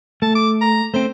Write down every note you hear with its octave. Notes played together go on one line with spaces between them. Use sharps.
A3 A5
D6
A#5
A3 C4 C5